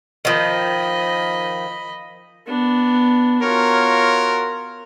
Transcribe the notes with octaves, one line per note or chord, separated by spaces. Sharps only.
D#3 F3 D#5 B5
B3 D4
F4 F#4 A#4 C#5